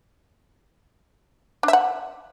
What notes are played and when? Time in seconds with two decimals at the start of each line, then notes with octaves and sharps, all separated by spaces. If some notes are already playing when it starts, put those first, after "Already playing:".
1.63 D4
1.68 E5
1.73 F#5